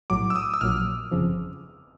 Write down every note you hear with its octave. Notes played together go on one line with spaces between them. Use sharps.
B1 A2 F#3 D6
E6
D#6
E6
A#1 A#2 F#3 F6
G1 F2 C#3 F3